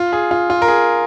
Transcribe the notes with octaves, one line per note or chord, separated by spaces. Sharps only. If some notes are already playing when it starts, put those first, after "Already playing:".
Already playing: F4
G#4
F4
F4
A#4
G#4